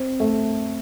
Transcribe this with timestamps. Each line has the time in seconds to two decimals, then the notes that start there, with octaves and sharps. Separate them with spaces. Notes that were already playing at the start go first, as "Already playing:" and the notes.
Already playing: C4
0.20 A3